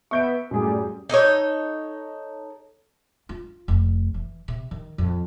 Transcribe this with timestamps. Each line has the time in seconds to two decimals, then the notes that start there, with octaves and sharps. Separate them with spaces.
0.11 B3 E5 C#6 G6 D7
0.51 F#2 A2 G3 G#4
1.09 D#4 A4 A#4 C#5
3.29 F4
3.68 F1
4.14 E3
4.48 C3
4.71 D#3
4.98 F2